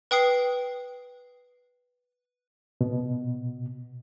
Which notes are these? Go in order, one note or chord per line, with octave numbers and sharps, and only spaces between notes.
B4 G5 D#6 C7
B2